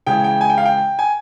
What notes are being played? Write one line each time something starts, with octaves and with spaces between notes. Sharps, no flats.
C#3 E3 G#3 G5
G5
G#5
G5
F5
G5
G#5